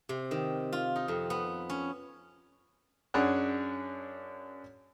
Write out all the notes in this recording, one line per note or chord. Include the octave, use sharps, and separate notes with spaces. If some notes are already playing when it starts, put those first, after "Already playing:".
C3
D#3
F4
D#4
F2
B3
C#4
F#2 D4 G#4 C#5 F#5